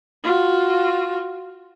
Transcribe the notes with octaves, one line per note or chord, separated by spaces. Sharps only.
F4 F#4